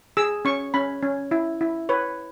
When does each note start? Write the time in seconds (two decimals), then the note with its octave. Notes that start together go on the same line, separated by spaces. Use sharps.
0.17 G#4 E6
0.45 C#4 C#6
0.74 C#4 B5
1.03 C#4
1.31 E4
1.61 E4
1.89 B4 C#5